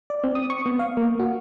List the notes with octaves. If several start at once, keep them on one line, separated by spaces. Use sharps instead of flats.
D5
C4
D#6
C#6
B3
F5
A#3
F#4